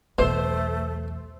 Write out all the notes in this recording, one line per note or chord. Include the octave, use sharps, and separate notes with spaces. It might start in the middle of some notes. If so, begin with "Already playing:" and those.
B1 E2 B2 A3 C5